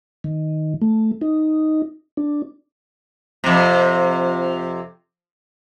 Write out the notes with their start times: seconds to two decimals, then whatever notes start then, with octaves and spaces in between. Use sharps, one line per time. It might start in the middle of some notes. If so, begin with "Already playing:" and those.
0.24 D#3
0.81 A3
1.22 D#4
2.17 D4
3.44 F2 C3